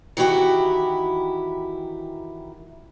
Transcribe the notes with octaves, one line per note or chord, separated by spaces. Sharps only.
D#3 E3 E4 F#4 G4